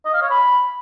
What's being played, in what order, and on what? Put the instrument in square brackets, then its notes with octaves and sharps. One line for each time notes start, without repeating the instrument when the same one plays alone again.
[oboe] D#5
F5
C#5
B5